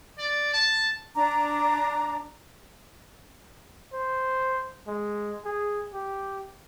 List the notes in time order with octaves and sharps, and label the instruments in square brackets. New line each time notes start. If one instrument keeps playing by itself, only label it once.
[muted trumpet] D5
A5
[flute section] D4 A#5 D6
[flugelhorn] C5
G#3
G#4
G4